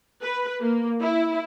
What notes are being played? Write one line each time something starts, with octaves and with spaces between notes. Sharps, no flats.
B4
A#3
E4